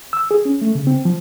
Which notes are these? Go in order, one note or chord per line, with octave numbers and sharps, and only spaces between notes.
E6
G#4
C#4
A3
C#3
C4
F3